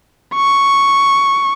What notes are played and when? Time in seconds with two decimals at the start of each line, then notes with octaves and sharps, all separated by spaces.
0.35 C#6